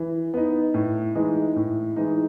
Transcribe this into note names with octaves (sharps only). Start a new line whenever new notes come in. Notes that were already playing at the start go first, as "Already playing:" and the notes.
Already playing: E3
B3 D#4
A2
E3 G#3 D#4
A2
E3 G#3 D#4